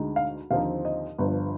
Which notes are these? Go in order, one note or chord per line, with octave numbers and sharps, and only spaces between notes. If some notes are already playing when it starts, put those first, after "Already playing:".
Already playing: D2 D3 G#3 D#4
F5
D#2 D3 F3 C4 D#4 F5
D#5
G1 G2 F3